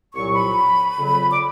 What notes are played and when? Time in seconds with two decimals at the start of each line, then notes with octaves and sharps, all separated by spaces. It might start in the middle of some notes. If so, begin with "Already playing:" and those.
0.13 C2 A#2 F#3 C#6
0.34 B5
0.97 F2 C#3 F#3
1.31 D6